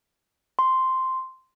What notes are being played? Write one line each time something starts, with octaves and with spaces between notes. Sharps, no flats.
C6